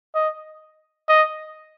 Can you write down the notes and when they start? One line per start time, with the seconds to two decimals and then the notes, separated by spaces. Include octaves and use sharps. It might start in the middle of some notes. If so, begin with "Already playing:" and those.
0.15 D#5
1.09 D#5